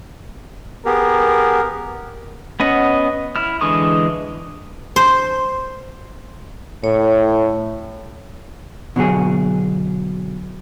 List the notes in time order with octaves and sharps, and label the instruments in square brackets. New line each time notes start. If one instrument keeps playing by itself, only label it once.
[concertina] B3 G4 G#4 [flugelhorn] A#4
[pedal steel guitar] B3 C#4 D#5 F#5
E4 F6
D3 E3 G#3 C#6 D#6
[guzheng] C5
[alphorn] A2 [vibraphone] C#5
[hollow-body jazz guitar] B2 D3 F#3 G#4